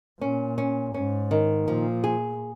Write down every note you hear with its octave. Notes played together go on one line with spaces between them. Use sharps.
A#2 C#4
C#4
G#2 C#4
D#3
A#2 F3
G#4